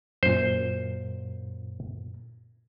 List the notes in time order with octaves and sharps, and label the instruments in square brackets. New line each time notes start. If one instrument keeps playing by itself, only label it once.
[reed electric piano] F#2 A#2 [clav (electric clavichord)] C5